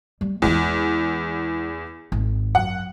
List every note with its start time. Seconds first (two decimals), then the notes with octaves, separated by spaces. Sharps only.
0.21 G3
0.42 E2 G#3 F4
2.12 G#1
2.55 F#2 F#5